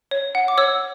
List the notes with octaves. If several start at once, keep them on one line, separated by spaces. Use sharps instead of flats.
C#5
F#5
D6
C#5 E6